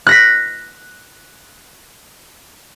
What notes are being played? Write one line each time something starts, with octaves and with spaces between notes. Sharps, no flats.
F#6 A#6 B6